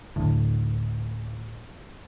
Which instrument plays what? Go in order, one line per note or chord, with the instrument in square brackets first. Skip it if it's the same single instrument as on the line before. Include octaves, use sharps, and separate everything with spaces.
[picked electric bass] D1 D2 A2